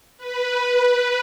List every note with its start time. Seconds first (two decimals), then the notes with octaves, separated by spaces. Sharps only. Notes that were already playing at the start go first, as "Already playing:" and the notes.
0.17 B4